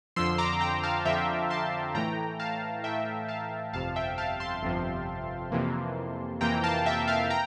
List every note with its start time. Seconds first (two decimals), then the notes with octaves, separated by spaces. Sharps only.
0.16 F2 D3 F3 C6 E6
0.38 A#5 D6
0.61 G5 A#5
0.83 F5 A5
1.05 F2 D3 F3 E5 G5
1.50 A5 C6
1.95 A2 E3 A3 G5 A#5
2.40 F5 A5
2.84 A2 E3 A3 E5 G5
3.29 F5 A5
3.73 G1 F2 C3 F3 F5 A5
3.96 E5 G5
4.18 F5 A5
4.40 A5 C6
4.63 G1 F2 C3 F3
5.52 F2 C3 E3 A#3
6.41 F2 C3 E3 A#3 G5 A#5
6.64 F5 A5
6.86 E5 G5
7.08 F5 A5
7.30 G5 A#5